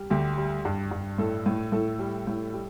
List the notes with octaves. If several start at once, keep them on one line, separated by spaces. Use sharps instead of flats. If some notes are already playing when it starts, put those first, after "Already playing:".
Already playing: G3
D2 G4
G3
G2
G2
A2 A4
A2
A2 A4
G3
A2
G3